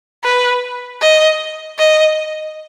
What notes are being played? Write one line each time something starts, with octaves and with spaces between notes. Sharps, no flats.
B4
D#5
D#5